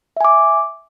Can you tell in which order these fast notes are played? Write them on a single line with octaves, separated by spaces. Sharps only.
E5 G#5 D6